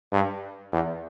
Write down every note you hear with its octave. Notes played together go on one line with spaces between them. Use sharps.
G2
E2